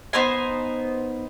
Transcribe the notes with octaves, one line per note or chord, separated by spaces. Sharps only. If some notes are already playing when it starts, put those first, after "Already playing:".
B3 D#4 C5 G#5